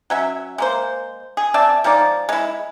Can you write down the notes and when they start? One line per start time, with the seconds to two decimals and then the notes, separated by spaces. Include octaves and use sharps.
0.10 F#3 C#4 E5
0.58 G#3 A#3 C5
1.37 G#4
1.54 C4 D5 E5 A5
1.84 F3 G#3 D#4 D5
2.29 G#3 E4